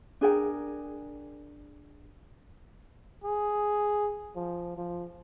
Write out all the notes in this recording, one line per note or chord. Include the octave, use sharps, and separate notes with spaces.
D4 G#4 A#4 G5
G#4
F3
F3